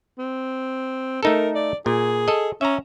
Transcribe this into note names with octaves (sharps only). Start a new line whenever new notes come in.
C4
A3 D#4 A4 A#4
D5
A#2 G#4
A4 D#5
C#4 E5 A#5